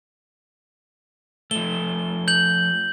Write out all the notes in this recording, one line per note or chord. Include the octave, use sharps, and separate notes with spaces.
F3 A3 G7
G6 F#7